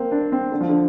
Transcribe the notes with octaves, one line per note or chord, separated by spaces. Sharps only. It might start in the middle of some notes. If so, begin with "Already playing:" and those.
Already playing: A#3 C4
D4
C4
D3
F3
D3